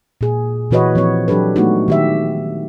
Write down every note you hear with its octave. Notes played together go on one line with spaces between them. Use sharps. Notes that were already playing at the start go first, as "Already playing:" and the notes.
A#2 G#4
A#2 E3 F#4 B4 C#5 D#5
F3 C4 C#5
F#3 D4 G4 A4 B4
G#3 A3 B3 D4 D#4 F#4
D#3 G4 E5